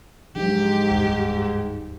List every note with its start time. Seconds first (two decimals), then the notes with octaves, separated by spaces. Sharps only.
0.36 G#2 F3 F#3 D4 G4
0.91 D1 E2 G2